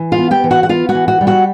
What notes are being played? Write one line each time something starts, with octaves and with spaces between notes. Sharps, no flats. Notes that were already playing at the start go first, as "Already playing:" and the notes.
Already playing: E3
F4 F5
B3
G4 G5
E3
F#4 F#5
F#5
B3 F4 F5
F#4 F#5
E3
F#4 F#5
G3
F#4 F#5